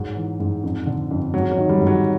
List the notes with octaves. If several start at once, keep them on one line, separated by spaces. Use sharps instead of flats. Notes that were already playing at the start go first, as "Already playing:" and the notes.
Already playing: G#2 F#3
E3
G#2
F2
D3
F2
G#2 F#3
F#3
D#3
G3
G#2
F#3